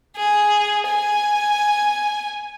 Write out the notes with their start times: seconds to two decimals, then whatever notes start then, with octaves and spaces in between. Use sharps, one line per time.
0.17 G#4
0.87 G#5